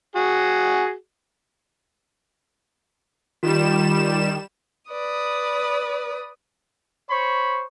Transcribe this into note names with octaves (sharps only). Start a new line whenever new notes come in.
F#4 G#4
D#3 G3 F4 E7
B4 D5 D#6
C5 C#5 B5 C#6